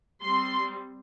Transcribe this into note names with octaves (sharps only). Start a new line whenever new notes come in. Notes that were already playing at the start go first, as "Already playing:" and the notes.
G3 C4 C6